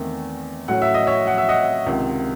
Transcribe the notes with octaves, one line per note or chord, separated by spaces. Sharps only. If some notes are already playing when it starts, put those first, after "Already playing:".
Already playing: E2 D#3 A3 C4
A2 F#3 C#4 F#5
E5
D#5
C#5 E5
F#5
E5
D#5 F#5
C#2 C3 D#3